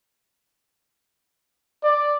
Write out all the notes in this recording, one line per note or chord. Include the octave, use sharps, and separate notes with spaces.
D5